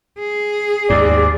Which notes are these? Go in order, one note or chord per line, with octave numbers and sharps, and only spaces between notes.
G#4
D#2 G#2 D5